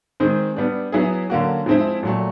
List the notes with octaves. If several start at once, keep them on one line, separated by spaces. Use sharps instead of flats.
D#3 G#3 C4
G3 B3 D4
F#3 B3 E4 G#4
D3 F#3 A#3 C#4 F#4
F3 G#3 C4 E4
A#2 F#3 A3